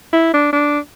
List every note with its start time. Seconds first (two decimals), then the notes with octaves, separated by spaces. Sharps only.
0.13 E4
0.34 D4
0.53 D4